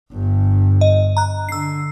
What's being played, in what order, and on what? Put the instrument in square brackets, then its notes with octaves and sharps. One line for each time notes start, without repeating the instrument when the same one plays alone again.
[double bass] G1 G2
[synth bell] D#5
A#5 F#6
[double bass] D3 [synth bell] E6 C7